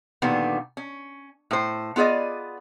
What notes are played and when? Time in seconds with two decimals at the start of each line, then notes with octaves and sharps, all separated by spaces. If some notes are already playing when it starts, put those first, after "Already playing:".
0.22 A#2 D3 D#3 F#3 G3 B3
0.77 C#4
1.51 A2 C5
1.96 B3 F4 G#4 D5 D#5